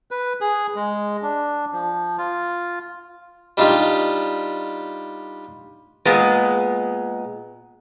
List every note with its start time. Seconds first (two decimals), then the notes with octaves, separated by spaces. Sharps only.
0.11 B4
0.41 G#4
0.75 G#3
1.22 D4
1.72 F3
2.18 F4
3.57 G3 D4 D#4 F4 G4
6.05 A#2 G#3 B3